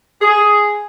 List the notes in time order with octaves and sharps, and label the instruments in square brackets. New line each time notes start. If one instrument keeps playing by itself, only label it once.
[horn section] G#4